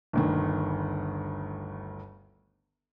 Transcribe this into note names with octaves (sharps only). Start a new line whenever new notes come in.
G1 D2 D#3